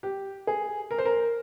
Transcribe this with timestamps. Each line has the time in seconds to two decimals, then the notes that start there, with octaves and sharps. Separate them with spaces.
0.03 G4
0.47 G#4
0.91 A#4
0.99 C5
1.05 A#4